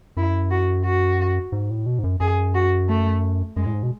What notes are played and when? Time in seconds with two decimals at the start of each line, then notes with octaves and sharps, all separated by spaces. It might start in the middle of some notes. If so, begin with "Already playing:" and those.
0.17 F#2 E4
0.51 F#4
0.85 F#4
1.52 G#2
1.70 A2
1.86 B2
1.99 G#2
2.04 F#2
2.20 F#2 G#4
2.55 F#4
2.89 A3
3.56 F#2 G#3
3.66 A2
3.73 G#2
3.83 B2